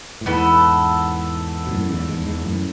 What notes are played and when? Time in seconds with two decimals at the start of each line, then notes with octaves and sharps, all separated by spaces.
0.21 A2
0.26 E2 G#2 B3 E4 A4
1.66 B2
1.72 F#2 A2
1.89 E2 G#2
2.08 E2 G#2
2.26 E2 G#2
2.44 F#2 A2